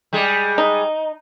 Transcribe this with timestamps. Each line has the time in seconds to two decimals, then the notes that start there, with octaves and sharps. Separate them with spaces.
0.13 G3 G#3 G#4
0.58 D#4